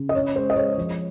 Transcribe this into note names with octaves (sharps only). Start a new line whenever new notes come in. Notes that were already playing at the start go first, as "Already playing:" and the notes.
Already playing: C#3
D#5
C#4 C#5
G#3 C5
D#5
G#3 C#5
F3